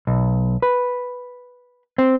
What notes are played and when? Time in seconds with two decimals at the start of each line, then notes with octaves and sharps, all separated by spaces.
0.07 B1
0.62 B4
1.98 C4